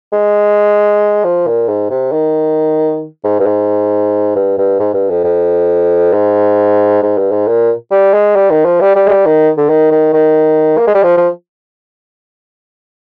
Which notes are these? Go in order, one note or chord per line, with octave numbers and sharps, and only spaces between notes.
G#3
F3
A#2
G#2
C3
D#3
G#2
G2
G#2
G2
G2
G#2
G2
F2
F2
G#2
G#2
G2
G#2
A#2
G3
G#3
G3
D#3
F3
G3
G3
G#3
G3
D#3
D3
D#3
D#3
D#3
A#3
G#3
G3
F3
F3